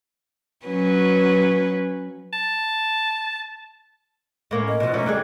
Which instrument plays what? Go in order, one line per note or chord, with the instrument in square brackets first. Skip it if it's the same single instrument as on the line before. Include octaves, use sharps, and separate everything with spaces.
[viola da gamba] F#3 C#4 B4
[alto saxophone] A5
[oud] A2 A#3 C#4
[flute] D#5
[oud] B2 F3
A3 A#3 C#4
D3 G3 G#4